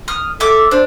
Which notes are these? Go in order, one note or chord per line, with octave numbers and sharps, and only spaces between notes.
D#6 F6
A4 E5 D6
D4 C5